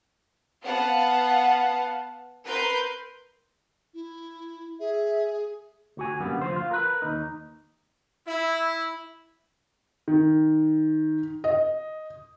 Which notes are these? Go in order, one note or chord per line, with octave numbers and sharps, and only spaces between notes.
B3 F5 F#5 A5
A#4 B4 C6 G6
E4
G#4 E5
D2 F#4 G#5
F#2 D3 G3 A#3 B3
D2 F3 C5
F4
A#4 B4
D#2 D#4
E4
D#3
D#5